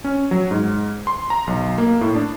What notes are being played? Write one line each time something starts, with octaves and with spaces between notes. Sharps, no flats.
C#4
F#3
G#2
C6
A#5
B1
A#3
A2
D4